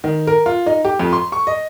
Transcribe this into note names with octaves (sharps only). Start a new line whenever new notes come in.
D#3
A#4
F4
D#4
G4
F2
C6
C#6
D#5